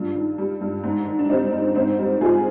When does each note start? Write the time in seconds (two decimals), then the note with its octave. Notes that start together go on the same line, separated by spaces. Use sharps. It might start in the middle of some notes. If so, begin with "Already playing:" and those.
Already playing: G2 G3 D4 F4
0.15 D#3
0.38 G3
0.61 G2
0.83 G#2
1.07 D#3
1.19 D4
1.30 G3 C4 D#4
1.52 G#2
1.75 G#2 C4 D#4
1.99 G3
2.21 G#2 F4 G#4